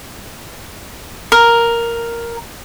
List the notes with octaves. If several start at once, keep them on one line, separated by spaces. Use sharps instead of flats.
A#4